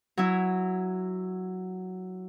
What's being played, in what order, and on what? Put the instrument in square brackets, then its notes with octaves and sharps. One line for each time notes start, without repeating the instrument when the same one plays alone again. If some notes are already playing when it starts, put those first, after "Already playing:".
[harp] F#3 E4